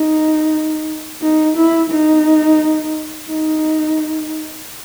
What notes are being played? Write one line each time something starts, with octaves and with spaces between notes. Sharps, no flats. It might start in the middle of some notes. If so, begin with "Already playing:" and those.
Already playing: D#4
D#4
E4
D#4
D#4